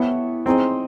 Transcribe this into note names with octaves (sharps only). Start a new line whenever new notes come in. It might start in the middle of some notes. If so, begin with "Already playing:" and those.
Already playing: B3 E4 G4 A4 B4 C#5 E5
C4 D#4 G#4 C5 D#5